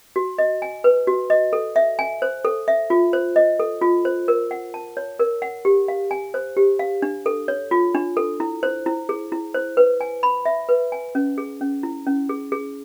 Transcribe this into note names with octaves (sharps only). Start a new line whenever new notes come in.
F#4
D#5
G#5
B4
F#4
D#5
A4
E5
G#5
C5
A4
E5
F4
C5
D#5
A4
F4
C5
A#4
F#5
A5
C#5
A#4
F#5
G4
F5
G#5
C5
G4
F5
D4
A4
C#5
F4
D4
A4
E4
C5
E4
G#4
E4
C5
B4
G#5
B5
E5
B4
G#5
C#4
G#4
C#4
E4
C#4
G#4
G#4